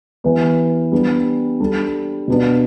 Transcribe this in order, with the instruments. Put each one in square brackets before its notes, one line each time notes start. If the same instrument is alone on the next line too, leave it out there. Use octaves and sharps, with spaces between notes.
[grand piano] E3 B3 G4 B4
G3 B3 D4
G3 D4 A4
B2 B3 D4